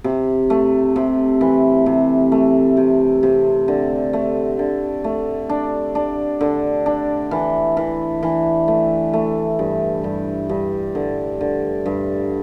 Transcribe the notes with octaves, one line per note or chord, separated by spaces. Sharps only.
C3
A3
C3
E3
C3
A3
C3
C3
D3
A3
D3
A3
D4
D4
D3
D4
E3
E3
E3
A3
A3
G2
G2
G2
D3
D3
G2